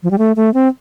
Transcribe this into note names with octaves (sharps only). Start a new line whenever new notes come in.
F3
G3
A3
A3
C4